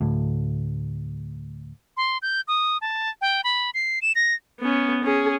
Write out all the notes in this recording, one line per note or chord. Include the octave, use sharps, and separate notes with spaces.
D2 A2
C6
G6
D#6
A5
G5
B5
C7
E7
A#6
B3 C#4
C#4 G#4